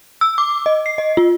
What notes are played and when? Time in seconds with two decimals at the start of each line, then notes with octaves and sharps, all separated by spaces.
0.21 E6
0.38 D6
0.66 D#5
0.86 C7
0.98 D#5
1.17 F4